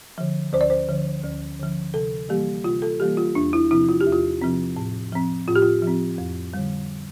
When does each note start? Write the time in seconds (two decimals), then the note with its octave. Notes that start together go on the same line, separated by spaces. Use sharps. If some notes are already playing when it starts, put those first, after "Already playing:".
0.18 D3 F3
0.53 D2 C5
0.61 D5
0.70 C5
0.88 D3 F3
1.24 D2
1.60 D3 F3
1.94 C3 A4
2.29 E3 G3 A#3 G4
2.64 C3 F4
2.82 A4
3.00 E3 G3 A#3 G4
3.17 F4
3.35 E2 D4
3.53 E4
3.71 C3 F3 C4 E4
3.89 F4
4.01 G4
4.07 E2
4.13 F4
4.41 C3 F3 C4
4.77 A2
5.12 F3 C4
5.48 A2 F4
5.56 G4
5.62 F4
5.82 F3 C4
6.18 F2
6.54 D3 G3